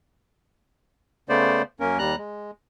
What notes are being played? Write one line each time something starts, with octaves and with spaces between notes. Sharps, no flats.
C#3 A3 B3 C5 D5
F#2 A#3 C#4 A#4
D#2 G3 A#5 F#6
G#3